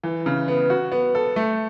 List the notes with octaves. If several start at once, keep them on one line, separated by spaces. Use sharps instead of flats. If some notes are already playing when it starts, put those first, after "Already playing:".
E3
C#3
B3
F#4
B3
A4
A3